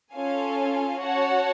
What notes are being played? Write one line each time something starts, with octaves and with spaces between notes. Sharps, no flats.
C#4 F4 A4 F5 G#5
F#4 C#5 F#5 A5